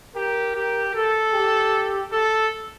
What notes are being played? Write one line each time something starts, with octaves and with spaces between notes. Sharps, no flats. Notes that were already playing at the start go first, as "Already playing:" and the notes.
G4 A#4
G4
A4
G4
A4